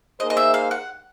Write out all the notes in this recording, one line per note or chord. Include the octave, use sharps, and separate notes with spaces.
A#3 D#4 G#4 C5 D#5
D#5
E5
F5
F#5